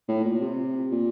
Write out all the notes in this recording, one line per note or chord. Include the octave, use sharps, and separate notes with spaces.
A2
A#2
C3
A#2